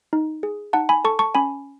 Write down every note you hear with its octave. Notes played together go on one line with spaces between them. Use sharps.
D#4
G#4
D#4 F#5 A5
G#5 B5
A4 A5 C#6
A5 C#6
C#4 G#5 B5